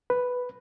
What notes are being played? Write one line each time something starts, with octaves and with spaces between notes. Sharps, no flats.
B4